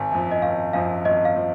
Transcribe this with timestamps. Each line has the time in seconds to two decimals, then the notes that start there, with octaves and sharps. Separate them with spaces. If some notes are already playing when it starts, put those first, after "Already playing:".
Already playing: G#1 G#5
0.11 F#2 F3
0.31 D#5
0.42 G#1 F5
0.73 F#2 F3 F5
1.05 G#1 D#5
1.25 F5
1.36 F3